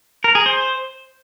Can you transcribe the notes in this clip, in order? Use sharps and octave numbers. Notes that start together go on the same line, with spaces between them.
A#4
G#4
C5